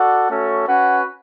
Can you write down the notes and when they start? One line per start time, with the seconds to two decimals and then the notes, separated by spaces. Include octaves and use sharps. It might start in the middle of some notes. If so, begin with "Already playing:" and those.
Already playing: F#4 A4 D5 F#5
0.29 A3 C#4 F#4 A4 C#5
0.67 C#4 F#4 B4 F#5